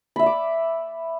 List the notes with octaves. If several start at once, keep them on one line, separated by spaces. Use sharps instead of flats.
D5 E5 B5 D6